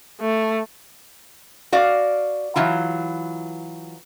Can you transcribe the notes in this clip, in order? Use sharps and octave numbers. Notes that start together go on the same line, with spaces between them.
A3
F#4 D5 F5
E3 F#3 F4